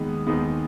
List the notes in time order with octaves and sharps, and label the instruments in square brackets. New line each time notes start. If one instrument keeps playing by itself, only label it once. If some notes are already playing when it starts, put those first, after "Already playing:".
Already playing: [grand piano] D#2 D#3 B3 [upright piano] G#3
[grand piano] D#2 D#3 G#3 B3